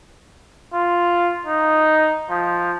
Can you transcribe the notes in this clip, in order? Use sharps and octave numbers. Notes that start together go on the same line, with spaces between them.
F4
D#4
F3